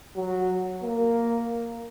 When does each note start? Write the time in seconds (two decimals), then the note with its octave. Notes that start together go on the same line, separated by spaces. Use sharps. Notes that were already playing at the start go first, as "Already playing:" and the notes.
0.16 F#3
0.83 A#3